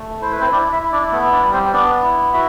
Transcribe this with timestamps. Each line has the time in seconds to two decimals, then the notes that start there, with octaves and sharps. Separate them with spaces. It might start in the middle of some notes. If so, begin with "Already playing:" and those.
Already playing: A3
0.22 E4 C5
0.32 B4
0.41 C4 C5
0.52 D4 E4 D5
0.72 E4 E5
0.82 E4
0.92 D4 D5
1.12 A3 B3 A4
1.32 D4 D5
1.43 G3
1.53 C4 C5
1.73 B3 D4 D5
2.03 E4
2.33 E4 F#4 E5